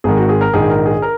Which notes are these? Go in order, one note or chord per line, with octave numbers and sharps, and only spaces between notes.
G#1 G#2 D#3 G#4
F#4
G#4
A#4
A#1 G#2 D#3 G#4
A#4
G#4
A#4